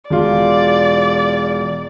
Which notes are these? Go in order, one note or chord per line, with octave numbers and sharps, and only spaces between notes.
E1 F4 D5